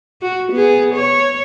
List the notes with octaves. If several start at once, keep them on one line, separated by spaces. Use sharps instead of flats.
F#4
B3 G#4
C#5